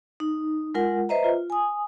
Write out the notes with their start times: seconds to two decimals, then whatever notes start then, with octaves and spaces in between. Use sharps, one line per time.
0.20 D#4
0.74 G#3 F4 A#4 F#5
1.09 B4 C5 D#5 E5 A#5
1.24 F4
1.50 G#5 D#6